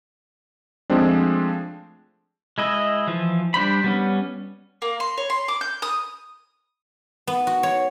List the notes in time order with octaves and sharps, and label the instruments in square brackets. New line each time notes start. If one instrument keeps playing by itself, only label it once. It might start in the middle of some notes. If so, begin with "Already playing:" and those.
[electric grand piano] F3 G#3 A3 C4 D4
[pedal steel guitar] G#3 E4 D#5
E3 F3
G3 D4 C5 B5
G3 B3 C#4
[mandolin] A#3
C6
C#5
C6
D6
G6
D#6
[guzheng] B3
F#4
C#5